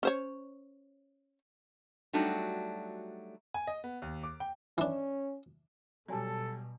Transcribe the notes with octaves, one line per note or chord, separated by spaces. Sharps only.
C#4 C5 C#5
F#3 G3 A3 D4 D#4 F#4
G#5
D#5
B3
D#2
D6
G5
E3 C#4 D4
B2 F#3 G3 A4 D5 G#5 A5